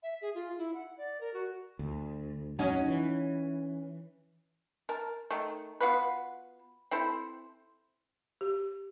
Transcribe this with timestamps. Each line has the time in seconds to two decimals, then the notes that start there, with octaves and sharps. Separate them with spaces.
0.03 E5
0.21 G#4
0.34 F4
0.58 E4
0.74 F#5
0.97 D5
1.21 A#4
1.34 F#4
1.79 D2
2.59 F2 F#3 C#4 D#4 F#4
2.88 E3
4.89 A#4 A5
5.31 D#3 A3
5.81 B3 F4 F#4 B4
6.91 C4 E4 A4 C5
8.41 G4